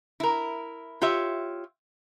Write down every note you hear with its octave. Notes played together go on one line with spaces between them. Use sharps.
E4 A#4
F4 G4 C#5 E5